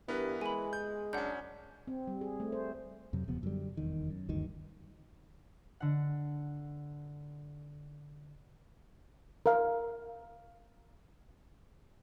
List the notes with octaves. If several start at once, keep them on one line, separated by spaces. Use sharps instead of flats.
G2 E3 B3 A#4 B4
G#3 G#5 B5
G6
F#2 C#4 D4 F#5 G6
C4
G3
G#4
A3
C5
F2 C3 F#3
D#1 C3 F3 B3
F#2 D3 G3
F1 E2 D#3
F#2
F#1 D2 G2 D#3
D3 F#5
A#4 F5